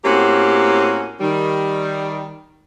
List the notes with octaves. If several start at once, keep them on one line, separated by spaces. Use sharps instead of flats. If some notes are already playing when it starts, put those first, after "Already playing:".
A2 A#3 C4 C#4 F#4 G4
D#3 G3